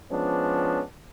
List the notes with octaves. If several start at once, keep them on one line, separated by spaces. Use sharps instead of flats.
F3 G#3 B3 C#4 D4